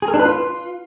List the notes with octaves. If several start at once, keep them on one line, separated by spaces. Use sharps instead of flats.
G#4
A#4
D4
B4
F4